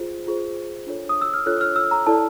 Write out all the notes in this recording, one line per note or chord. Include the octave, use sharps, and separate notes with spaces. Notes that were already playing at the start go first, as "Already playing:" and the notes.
Already playing: F4 G#4 C5
F4 G#4 C5
D4 F4 A4 C#5
D#6
E6
F6
D4 F4 A4 C#5 F#6
F6
E6
A#5
E4 A4 D5 A5